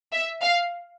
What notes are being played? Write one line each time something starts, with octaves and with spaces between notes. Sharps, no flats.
E5
F5